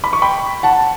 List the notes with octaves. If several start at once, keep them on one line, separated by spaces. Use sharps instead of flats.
B5
C#6
G5 B5
F#5 A5